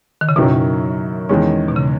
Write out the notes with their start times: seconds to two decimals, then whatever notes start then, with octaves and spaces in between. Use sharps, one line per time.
0.21 D#3
0.29 C#3
0.36 F#2 B2 D#3 F#3 C#4 E4
1.29 E2 D#3 G#3 C#4
1.68 B2
1.76 C#3